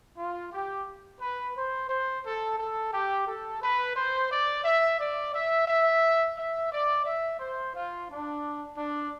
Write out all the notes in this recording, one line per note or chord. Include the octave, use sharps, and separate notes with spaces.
F4
G4
B4
C5
C5
A4
A4
G4
A4
B4
C5
D5
E5
D5
E5
E5
E5
D5
E5
C5
F4
D4
D4